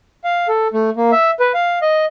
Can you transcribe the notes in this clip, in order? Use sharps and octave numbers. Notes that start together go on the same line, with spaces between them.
F5
A4
A3
A#3
E5
B4
F5
D#5